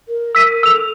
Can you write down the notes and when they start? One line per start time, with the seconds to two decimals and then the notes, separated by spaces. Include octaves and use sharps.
0.08 A#4
0.35 E6 B6 D#7
0.63 A4 E6 F7